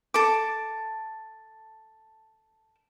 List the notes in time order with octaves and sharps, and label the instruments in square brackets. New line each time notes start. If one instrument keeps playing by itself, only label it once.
[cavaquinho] A4 A5 D6